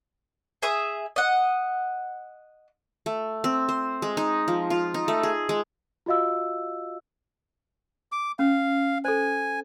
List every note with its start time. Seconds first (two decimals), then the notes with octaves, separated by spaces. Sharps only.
0.62 G#4 E5 D#6
1.16 D#5 F#5
3.06 A3
3.44 C4
3.69 C5
4.02 G#3
4.17 D#4
4.48 F3
4.70 F4
4.94 D#4
5.08 A3
5.23 G#4
5.49 G#3
6.06 F4 F#4 D#5 F5 E6
8.12 D6
8.39 C#4 F5
9.05 A4 C5 G#5